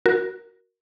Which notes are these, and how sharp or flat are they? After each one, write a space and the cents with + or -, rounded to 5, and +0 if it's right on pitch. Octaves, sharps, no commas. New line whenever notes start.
F#4 +0 A#4 +0